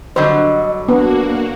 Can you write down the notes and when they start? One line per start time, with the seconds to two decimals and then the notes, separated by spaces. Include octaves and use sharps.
0.16 D3 F#3 G3 C5 D#5
0.88 A#3 B3 D4 F#4